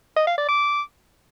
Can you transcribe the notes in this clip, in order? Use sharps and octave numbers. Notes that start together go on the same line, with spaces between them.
D#5
F5
D5
D6